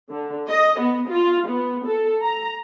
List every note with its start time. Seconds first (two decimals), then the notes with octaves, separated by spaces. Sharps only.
0.11 D3
0.48 D#5
0.80 B3
1.09 F4
1.48 B3
1.86 A4
2.22 A#5